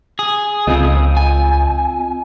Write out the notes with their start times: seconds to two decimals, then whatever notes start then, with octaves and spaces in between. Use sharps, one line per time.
0.19 G#4
0.67 C#2 C4 F4 D#5
1.17 G#5